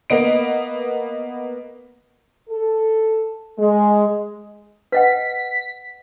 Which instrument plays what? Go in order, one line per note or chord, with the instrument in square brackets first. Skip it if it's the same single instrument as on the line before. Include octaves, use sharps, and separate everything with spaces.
[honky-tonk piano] A#3 B3 D#5 D7
[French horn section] A4
G#3
[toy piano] B4 D#5 F#5 [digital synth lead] B6